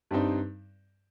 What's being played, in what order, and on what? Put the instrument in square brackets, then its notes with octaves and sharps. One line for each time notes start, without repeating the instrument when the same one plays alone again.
[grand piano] G2 G3 C4 D#4